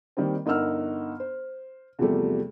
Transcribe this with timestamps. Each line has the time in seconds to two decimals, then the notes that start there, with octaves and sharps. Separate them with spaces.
0.17 D#3 G3 A#3 C4
0.46 G1 D#4 A#4 F#5 E6 F6
1.20 C5
1.99 E2 C3 F3 G3 A3